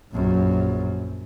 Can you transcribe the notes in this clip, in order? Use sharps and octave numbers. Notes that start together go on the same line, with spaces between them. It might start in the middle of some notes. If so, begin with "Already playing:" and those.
A#1 F#2